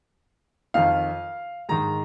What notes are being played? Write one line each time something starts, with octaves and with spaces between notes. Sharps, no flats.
F2 D#3 F5
G#2 D#3 A#5